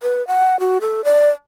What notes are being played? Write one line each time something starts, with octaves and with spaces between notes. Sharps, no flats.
B4
F#5
F#4
A4
D5